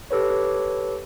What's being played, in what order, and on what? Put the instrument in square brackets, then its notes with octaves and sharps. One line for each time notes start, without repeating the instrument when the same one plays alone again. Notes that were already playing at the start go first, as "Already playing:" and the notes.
[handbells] G4 A4 B4 C#5